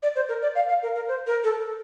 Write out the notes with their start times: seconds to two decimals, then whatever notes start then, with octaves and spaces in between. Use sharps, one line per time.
0.03 D5
0.16 C5
0.29 A#4
0.42 D5
0.55 F5
0.69 F5
0.82 A#4
0.95 A#4
1.08 C5
1.27 A#4
1.44 A4